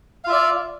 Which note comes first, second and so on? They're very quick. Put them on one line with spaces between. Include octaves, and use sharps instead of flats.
F5 F4 E5 D5